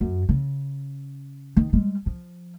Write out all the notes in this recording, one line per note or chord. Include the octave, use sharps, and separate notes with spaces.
F#2
C#3
D#3
G3 G#3
F3